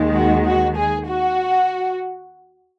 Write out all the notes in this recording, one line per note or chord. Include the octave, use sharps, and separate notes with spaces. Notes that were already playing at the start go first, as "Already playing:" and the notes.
Already playing: D#2 D#3 G#3
F#4
F#4
G#4
F#4